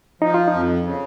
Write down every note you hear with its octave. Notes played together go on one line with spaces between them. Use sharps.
F3 D#4
F4
D#4
F2
C#3